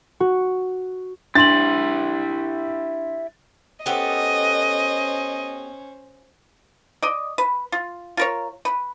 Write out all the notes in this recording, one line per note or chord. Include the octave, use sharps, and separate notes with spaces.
F#4
D4 E4 G4 C6 A6 F#7
B3 C#4 G4 A4 C5 D#5
D5 D#5
B4
F4
F4 A#4 C#5
B4